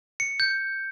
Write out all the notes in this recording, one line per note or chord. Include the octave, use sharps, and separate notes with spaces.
C#7
G6